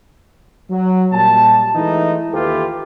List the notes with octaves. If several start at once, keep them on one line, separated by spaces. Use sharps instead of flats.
F#3
A#2 G3 A5
E3 G#3 A3 D#4 E4
D#2 E3 F4 G4 A4 B4